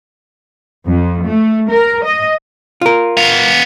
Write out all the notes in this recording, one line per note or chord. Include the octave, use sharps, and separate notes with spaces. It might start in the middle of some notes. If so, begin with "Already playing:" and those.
F2
A3
A#4
D#5
F4 A#4
B3 F5